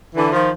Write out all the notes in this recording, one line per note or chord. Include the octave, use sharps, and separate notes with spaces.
D3 E3
D#3 F3